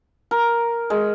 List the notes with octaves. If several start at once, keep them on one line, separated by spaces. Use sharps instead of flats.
A#4
G#3